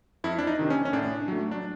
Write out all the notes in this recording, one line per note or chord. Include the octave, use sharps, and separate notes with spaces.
F2 E4
D4
D#4
C3 D#3
C#4
C#4
A2 D4
F#3 A3
D4